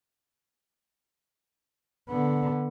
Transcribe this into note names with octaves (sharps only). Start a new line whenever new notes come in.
D3 B3